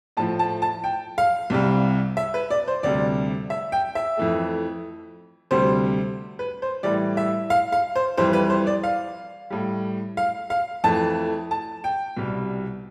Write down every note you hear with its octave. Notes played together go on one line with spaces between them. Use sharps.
A2 F3 A3 A5
A5
A5
G5
F5
C2 C3 G3
E5
B4
D5
C5
D2 C3 G3 D5
E5
G5
E5
F2 E3 A3
D2 C3 G3 C5
B4
C5
A2 E3 G3 D5
E5
F5
F5
C5
F2 E3 G3 C5
B4
C5
D5
F5
A2 G3
F5
F5
F2 E3 A3 A5
A5
G5
C2 B2 G3